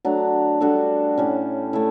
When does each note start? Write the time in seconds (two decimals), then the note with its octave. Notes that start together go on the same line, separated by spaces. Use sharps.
0.05 F#3 A3 D4 F#4
0.61 G3 D4 F#4 A4
1.18 A2 G3 C#4
1.73 A3 E4